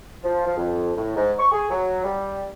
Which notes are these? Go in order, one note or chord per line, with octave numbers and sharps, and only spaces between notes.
F3
F3
F2
A2
G#2
C#6
G#4
F#3
G3